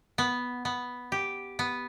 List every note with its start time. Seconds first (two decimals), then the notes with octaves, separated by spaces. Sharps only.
0.18 B3
0.65 B3
1.12 G4
1.59 B3